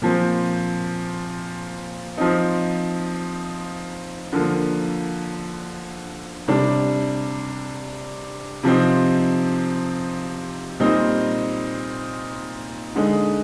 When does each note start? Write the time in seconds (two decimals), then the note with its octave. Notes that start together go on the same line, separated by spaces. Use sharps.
0.02 A#2 F3 C4
2.18 F3 C4 D#4
4.33 D3 F3 A#3
6.48 C3 G3 D4
8.63 C3 F3 C4 D#4
10.80 A#2 G3 C4 D#4
12.95 D3 G#3 D#4